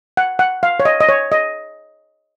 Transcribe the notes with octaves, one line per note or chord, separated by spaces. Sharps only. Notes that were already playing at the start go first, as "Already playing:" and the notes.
F#5
F#5
F5
C#5
D#5
D#5
C#5
D#5